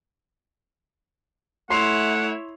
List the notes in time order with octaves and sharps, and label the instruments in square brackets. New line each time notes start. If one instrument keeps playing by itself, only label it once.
[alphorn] A3 [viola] E4 C#5 [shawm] F#5 [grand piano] C6 C7 F7